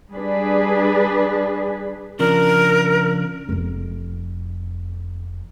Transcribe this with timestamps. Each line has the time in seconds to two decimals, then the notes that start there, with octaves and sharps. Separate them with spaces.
0.12 G3 D4 G#4 B4
2.19 C#3 F3 D4 A#4
3.49 F1 F2